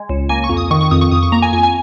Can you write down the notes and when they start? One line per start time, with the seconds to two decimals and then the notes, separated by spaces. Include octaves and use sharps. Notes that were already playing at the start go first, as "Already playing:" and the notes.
Already playing: G#3
0.09 C#2
0.29 A#3 G#5
0.44 C#6
0.50 F2
0.57 D#6
0.71 D#3 C#6
0.81 C#6
0.91 F2 D#6
1.01 C#6
1.11 F2 D#6
1.23 C#6
1.32 A#3 A#5
1.42 G#5
1.53 F2 G#5
1.63 G#5